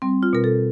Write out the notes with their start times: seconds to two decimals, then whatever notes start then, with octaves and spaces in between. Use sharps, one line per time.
0.02 G3 C4
0.23 F4
0.33 B2 A#4
0.44 A4